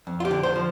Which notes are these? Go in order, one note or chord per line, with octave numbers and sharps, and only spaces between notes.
F2
F4
G4
D3
C5
F3